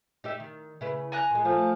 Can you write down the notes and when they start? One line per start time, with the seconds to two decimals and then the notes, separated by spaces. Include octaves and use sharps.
0.24 D#4 G4 E5
0.40 D#3
0.81 C#3 E4 B4
1.12 G#5 A#5 F#6
1.31 A#2 G#3
1.45 F3 A3